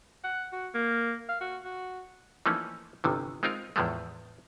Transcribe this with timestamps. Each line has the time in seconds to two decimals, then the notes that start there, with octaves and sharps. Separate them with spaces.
0.24 F#5
0.52 F#4
0.74 A#3
1.29 F5
1.41 F#4
1.64 F#4
2.46 E3 F3 A3 A#3 C#4 D#4
3.04 G1 C3 D#3 E3
3.43 G#3 C4 D#4 F4 A#4
3.76 E2 A2 F3 G#3 A3